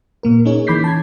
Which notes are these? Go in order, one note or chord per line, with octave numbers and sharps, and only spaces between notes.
A#2 A#3 A#4
C#4 D#4 G#4 C#5
E3 B5 D6 G6 B6 C7
A5 G#6